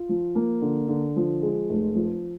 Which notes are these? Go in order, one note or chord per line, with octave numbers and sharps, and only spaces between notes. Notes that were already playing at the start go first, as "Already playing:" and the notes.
Already playing: F4
F3
A#3
D3
D3
F3
G#3
F1
F3